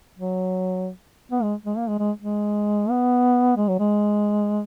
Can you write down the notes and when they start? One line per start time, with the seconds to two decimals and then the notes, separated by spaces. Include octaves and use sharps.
0.18 F#3
1.32 B3
1.43 G#3
1.66 G#3
1.77 A#3
1.88 G#3
1.99 G#3
2.22 G#3
2.90 B3
3.57 G#3
3.68 F#3
3.79 G#3